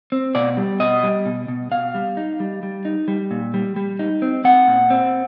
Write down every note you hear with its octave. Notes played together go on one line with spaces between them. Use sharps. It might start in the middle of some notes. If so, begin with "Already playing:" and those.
C4
B2 D5
G3
B2 D#5
G3
B2
B2
B2 F5
G3
D#4
G3
G3
D#4
G3
A#2
G3
G3
D#4
C4
C4 F#5
A#2
C4